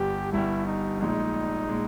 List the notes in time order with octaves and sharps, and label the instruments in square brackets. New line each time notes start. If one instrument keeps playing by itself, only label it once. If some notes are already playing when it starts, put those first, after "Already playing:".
Already playing: [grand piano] G1 G2 G3 [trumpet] G4
[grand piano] G1 G2 G3 [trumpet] E4
[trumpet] D#4
[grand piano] A#1 A#2 G#3 [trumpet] D#4
[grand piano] A#2 G#3